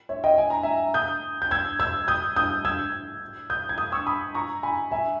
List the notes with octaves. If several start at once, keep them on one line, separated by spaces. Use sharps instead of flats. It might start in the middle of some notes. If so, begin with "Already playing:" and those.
C#5 E5
D#5 G5
G#5
A#5
E5 G#5
D#6 G6
G6
E6 G#6
E6 G#6
D#6 G6
D#6 G6
E6 G#6
D#6 G6
G#6
D#6 G6
C#6 E6
B5 D#6
A#5 C#6
G#5 B5
E5 G#5